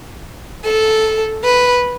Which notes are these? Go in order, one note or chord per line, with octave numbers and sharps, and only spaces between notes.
A4
B4